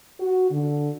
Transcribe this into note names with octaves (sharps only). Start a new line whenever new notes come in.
F#4
D3